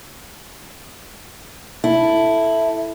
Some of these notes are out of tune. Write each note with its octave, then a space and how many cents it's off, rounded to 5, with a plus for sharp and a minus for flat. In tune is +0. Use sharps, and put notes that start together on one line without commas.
E4 +0 A4 +0